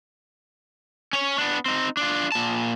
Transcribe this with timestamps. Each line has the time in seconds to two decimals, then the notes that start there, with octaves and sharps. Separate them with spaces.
1.13 C#4 C#5
1.38 B3 D4
1.66 C4 D#4
1.97 D4 F4
2.32 A#2 A5